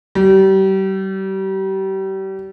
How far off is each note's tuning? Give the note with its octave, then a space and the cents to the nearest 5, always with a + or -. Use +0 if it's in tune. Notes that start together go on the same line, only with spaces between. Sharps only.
G3 -35